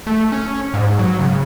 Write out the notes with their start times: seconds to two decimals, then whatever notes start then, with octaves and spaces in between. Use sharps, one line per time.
0.07 A3
0.32 C#4
0.74 G#2
0.99 F#3
1.19 C#3